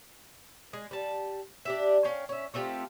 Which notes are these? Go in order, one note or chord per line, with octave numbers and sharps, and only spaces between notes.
G#3
G3 A5
D4 G4 E5
C#4 F5 G5
C#4 E5
A3 C4 F4 G4